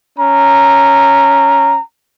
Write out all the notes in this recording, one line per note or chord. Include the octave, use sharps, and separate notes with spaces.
C#4 A#5